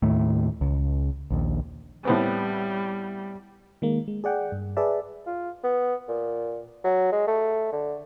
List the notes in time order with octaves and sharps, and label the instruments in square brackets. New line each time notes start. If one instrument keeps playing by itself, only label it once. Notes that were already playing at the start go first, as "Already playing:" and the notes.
[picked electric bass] D#2 A2 A3
C#2
A#1 D#2
[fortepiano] A2 B3 C4 [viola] G3
[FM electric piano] D#3 G#3 A#3
G#3
G#4 D5 F#5 G5
G2
G#4 B4 D5 E5 A5
[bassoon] F4
B3
A#2
F#3
G#3
A3
D3